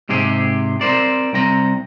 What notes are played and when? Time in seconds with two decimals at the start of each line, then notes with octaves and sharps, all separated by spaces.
0.09 G#2 C3 G4 G#4
0.81 C4 A#4 C5 D5
1.33 C2 C4 A#5